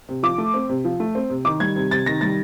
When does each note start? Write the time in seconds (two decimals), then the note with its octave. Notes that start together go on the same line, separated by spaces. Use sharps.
0.09 C3
0.23 F3 D6
0.38 A3
0.54 C4
0.69 C3
0.85 F3
1.00 A3
1.15 C4
1.30 C3
1.45 D#3 D6
1.60 G3 G#6
1.76 C3
1.91 C3 A6
2.06 D#3 A#6
2.21 G3 A6